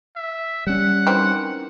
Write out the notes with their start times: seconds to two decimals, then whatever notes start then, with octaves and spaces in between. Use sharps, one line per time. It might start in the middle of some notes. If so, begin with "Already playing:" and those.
0.16 E5
0.67 G3 C#4 F#5
1.07 D#3 E3 C4